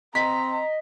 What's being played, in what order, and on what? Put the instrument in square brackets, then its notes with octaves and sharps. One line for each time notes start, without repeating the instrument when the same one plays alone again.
[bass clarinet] C4 [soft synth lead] D#5 [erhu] A#5 [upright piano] B6